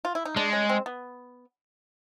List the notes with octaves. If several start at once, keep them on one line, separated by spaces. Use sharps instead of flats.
F4
E4
D#4
G#3 D4
C#4
C4
B3